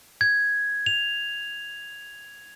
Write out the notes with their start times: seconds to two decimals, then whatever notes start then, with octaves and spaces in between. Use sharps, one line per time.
0.21 G#6
0.86 F7